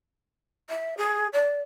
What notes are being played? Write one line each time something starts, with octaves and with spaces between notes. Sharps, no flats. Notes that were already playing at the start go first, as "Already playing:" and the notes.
E5
G#4
D5